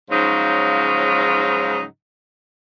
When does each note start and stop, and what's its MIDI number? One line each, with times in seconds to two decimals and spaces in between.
0.10 1.82 44
0.10 1.82 49
0.10 1.82 53
0.10 1.82 54
0.10 1.82 63